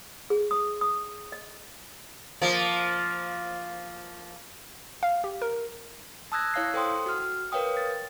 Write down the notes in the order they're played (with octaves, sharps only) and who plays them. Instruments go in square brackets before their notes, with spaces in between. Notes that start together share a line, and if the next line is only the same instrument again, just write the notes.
[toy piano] G#4
D#6
D#6
D#5
[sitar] F3 A#3
[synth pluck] F5
G4
A#4
[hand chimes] A5 D#6 E6 F#6 G#6 A#6
E4 C#5 F5 E6 C7
A4 C5 G5 C6 D#6
F#4 F6
A#4 B4 C#5 F5 G5 D#6
A6